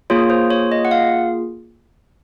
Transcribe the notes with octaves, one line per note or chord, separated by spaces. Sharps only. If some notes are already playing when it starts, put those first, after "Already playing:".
A#3 F4 G#4 C#5
C5
C#5
D#5
F#5
F5